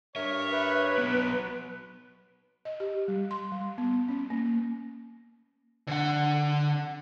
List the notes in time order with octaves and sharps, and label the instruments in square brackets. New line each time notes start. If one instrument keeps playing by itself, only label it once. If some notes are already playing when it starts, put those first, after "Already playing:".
[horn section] G2 A#4 C#5 [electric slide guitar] E5
[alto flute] B4
[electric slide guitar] F#3 B3
[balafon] D#5
G4
G3
C6
G3
B3
C#4
A#3
[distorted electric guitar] D3 F#5